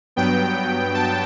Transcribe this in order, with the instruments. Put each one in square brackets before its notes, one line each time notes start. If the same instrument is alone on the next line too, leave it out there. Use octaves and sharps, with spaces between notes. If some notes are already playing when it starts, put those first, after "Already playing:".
[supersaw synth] G2 F#3 B3 G5
A5